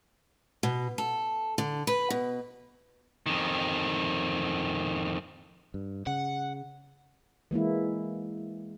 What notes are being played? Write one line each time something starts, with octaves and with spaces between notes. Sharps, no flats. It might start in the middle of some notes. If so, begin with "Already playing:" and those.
B2
A4
D3
B4
B2
F2 D#3
G2
C#3 F#5
E3 G#3 A#3 E4